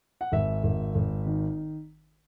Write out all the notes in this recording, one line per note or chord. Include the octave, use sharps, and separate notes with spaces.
F#5
G#1 E5
G#1
G#1
D#3